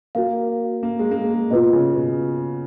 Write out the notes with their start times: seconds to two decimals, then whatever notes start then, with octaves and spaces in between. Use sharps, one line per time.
0.15 A#3 F#4 A#4 F5
0.83 A#3
0.99 G#3
1.11 A#3
1.17 G#3
1.34 G#3
1.51 B2 F4 B4 D#5
1.73 C#3
1.96 B2